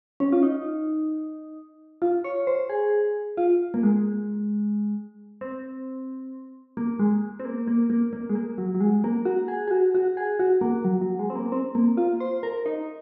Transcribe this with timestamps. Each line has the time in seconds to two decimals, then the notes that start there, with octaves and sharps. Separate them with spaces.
0.20 C#4
0.32 F4
0.43 D#4
2.02 F4
2.24 C#5
2.47 C5
2.70 G#4
3.37 F4
3.74 A#3
3.83 G#3
5.41 C4
6.77 A#3
6.99 G#3
7.40 C4
7.45 A#3
7.67 A#3
7.90 A#3
8.13 A#3
8.29 G#3
8.35 A#3
8.58 F#3
8.75 F#3
8.80 G#3
9.04 A#3
9.25 F#4
9.48 G#4
9.68 G#4
9.71 F#4
9.95 F#4
10.17 G#4
10.39 F#4
10.61 A#3
10.85 F#3
11.01 F#3
11.19 G#3
11.30 C4
11.36 A#3
11.52 C4
11.75 A#3
11.97 F4
12.20 C5
12.43 A#4
12.66 D#4